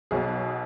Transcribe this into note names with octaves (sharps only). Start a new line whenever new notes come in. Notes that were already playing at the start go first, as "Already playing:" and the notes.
B1 B2 F#3 G#4